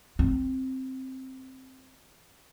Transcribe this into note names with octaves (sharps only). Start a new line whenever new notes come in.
C4